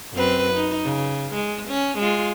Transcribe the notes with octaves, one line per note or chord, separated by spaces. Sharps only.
F#2 C4 B4
D#4
C#3
G#3
C#4
G#3 F4